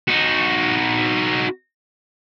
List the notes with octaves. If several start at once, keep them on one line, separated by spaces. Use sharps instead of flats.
D#4 F#4